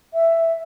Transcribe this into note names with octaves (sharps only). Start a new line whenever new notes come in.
E5